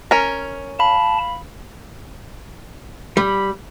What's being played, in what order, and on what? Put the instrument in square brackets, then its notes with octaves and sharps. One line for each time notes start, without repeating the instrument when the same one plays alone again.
[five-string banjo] C#4 A#4
[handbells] F5 B5 [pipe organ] A5
[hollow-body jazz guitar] G3 [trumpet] B5